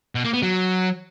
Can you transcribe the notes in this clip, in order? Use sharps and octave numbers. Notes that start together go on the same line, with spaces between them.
B2
A#3
B3
F#3